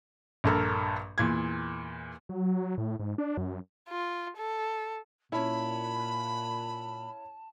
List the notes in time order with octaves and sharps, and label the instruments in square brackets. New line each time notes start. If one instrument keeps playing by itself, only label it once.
[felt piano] A#1 G2 A4 A#4
E2 A#2 G#6
[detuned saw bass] F#3
A2
G#2
D4
F#2
[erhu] F4
A4
[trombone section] A#2 [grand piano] C#4 E4 [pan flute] A5 [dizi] B5